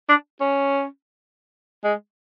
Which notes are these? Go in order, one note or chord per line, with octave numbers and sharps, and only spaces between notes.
D4
C#4
G#3